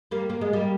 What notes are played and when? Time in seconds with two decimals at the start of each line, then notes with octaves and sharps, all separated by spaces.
0.11 G3 A#3
0.30 A#3
0.41 G#3
0.53 G3 A#3